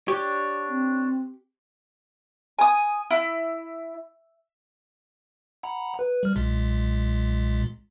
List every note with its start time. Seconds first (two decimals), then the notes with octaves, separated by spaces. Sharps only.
0.08 D4 G4 C#5
0.69 C4
2.59 G#5 D#6
3.10 E4
5.63 F#5 A#5 B5
5.99 B4
6.23 G3 F6
6.36 B1 A#2 G#3